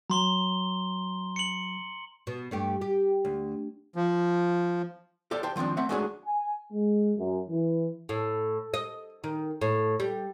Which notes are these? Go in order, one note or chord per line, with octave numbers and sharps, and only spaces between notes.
F#3 A#5 C6 G7
C#7 F#7
B2
G2 A3 G4
G4
D2
F3
G4 A4 C5 D5
G4 C5 G5 A5
D#3 F3 A#3 C4 D4
A3 C4 E5 F#5
G#3 A3 D4 F#4 G#4 C#5
G#5
G#3
F#2
E3
A2
D#5
D#3
A2
G3